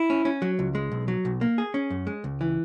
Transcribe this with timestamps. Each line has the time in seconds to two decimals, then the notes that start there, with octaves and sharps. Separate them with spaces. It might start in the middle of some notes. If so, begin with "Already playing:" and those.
Already playing: E4
0.10 C#4
0.25 C#4
0.42 F#3
0.59 C#2
0.75 G#3
0.92 B1
1.08 F#3
1.25 B1
1.41 A#3
1.58 G#4
1.74 C#4
1.90 F#2
2.07 G#3
2.24 C#2
2.41 E3